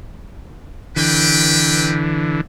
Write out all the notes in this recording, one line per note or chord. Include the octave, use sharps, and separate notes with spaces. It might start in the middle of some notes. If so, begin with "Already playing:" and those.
D3 E3 A#4 B4 G5